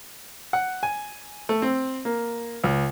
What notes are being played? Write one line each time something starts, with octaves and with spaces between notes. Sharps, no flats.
F#5
G#5
A3
C4
A#3
C#2